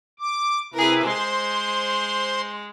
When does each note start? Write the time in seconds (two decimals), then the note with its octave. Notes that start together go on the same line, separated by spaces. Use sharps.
0.19 D6
0.74 C3 E4 G#4 A#4 B4
1.03 G#3 C5 C6